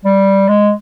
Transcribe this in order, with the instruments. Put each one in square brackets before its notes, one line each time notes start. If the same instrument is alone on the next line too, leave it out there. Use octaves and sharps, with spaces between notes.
[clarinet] G3
G#3